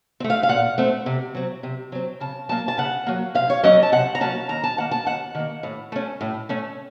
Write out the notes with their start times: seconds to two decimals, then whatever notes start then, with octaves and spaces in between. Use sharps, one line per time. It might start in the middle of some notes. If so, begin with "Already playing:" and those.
0.20 C4
0.24 A3
0.30 F5
0.43 F5
0.49 A#2 F#5
0.78 A3 C4
1.06 C3
1.35 F#3 C4
1.63 C3
1.92 F#3 C4
2.20 C#3 A5
2.49 F#3 A#3 A5
2.68 A5
2.78 C#3 F#5
3.07 F#3 A#3
3.35 C3 F5
3.50 C#5
3.63 F#3 A#3 C#4 D#5
3.83 A5
3.92 C3 F#5
4.15 A#5
4.21 F#3 A#3 C#4 A5
4.49 D#2 A#5
4.64 A5
4.77 D#3 A#3 F#5
4.91 A5
5.06 D#2 F#5
5.35 D#3 A#3
5.63 A2
5.92 A3 C#4
6.21 A2
6.49 A3 C#4